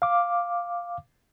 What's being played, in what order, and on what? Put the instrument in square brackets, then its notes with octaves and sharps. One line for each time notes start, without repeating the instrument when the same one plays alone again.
[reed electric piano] F5 D6